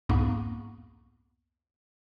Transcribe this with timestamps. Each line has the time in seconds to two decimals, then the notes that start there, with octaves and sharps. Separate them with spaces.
0.09 C2 F2 G#2 A#3 B3 C#6